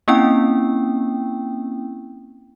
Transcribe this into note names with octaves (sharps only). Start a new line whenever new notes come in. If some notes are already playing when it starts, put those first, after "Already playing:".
A#3 C4 C#4 E4 G5